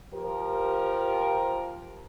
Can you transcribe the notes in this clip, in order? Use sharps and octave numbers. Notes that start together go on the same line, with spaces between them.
F3 G4 A#4